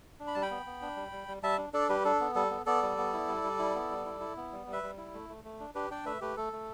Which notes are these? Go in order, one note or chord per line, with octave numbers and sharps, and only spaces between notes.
D4
B5
G3 A5
G5 B5
B3
B3
D4
G3
G3
G3
G3 E5 A5
D4
D4 A4 D5
G3 G4 B4
D4 A4
B3
G3 A4
B3
B3 A4 D5
G3
B3
E4
G3
G3
E4
B3
G3
E4
E4
B3
G3
G3
B4 E5
G3
E4
A3
A3
A3
D4
D4 G4 B4
D4 D5 G5
A3 B4 E5
A3 G4 B4
A3 A4
A3